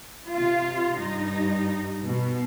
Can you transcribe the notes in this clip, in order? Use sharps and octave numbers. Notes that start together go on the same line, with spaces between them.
C3 F4
G2 G3 D#4
B2